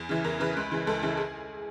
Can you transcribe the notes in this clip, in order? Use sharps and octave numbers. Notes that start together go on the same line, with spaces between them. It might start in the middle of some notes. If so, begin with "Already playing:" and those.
Already playing: E2
C#3 E3
E2 A#4
C#3 E3 B4
C#2
C#3 E3
C#2 A4
C#3 E3
G#4